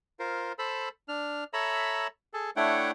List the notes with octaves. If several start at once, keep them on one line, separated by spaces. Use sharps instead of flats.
F4 A#4 C5
A4 C5 B5 E6
D4 F6
A4 C#5 E5 A#5 B5 E6
G#4 A4
A3 D4 E4 C#5 F#5 G5